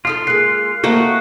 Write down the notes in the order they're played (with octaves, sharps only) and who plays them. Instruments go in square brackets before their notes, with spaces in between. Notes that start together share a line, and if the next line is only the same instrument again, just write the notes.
[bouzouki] F3 D#4 A4 [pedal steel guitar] F4
[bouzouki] G#3 A#3 [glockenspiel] F#6 C7
[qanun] A3 A#3 [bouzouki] C4 A#4 D#5 [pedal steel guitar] F#4